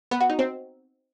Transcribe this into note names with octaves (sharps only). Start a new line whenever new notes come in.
B3
F#4
D#4
C4